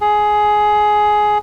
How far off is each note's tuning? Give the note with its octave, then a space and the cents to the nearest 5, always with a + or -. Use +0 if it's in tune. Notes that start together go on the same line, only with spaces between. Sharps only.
G#4 +15